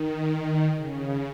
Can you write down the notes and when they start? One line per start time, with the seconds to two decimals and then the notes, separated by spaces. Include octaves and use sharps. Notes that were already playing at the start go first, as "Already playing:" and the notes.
Already playing: D#3
0.76 C#3